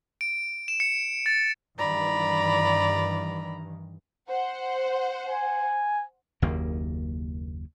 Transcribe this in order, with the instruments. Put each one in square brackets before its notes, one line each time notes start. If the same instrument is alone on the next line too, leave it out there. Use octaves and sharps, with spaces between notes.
[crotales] D7
E7
C#7
A6
[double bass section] G2 D#3 E3 [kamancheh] D5 B5 [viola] A#5
[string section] C5 F#5
[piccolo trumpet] G#5
[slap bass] F#1 D#2 C#3 A#3